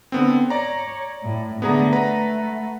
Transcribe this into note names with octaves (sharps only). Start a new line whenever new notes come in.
D3 B3 C4
C#5 D5 A#5
A2
D3 A3 B3 G#4 A#5
A3 B4 F#5 A#5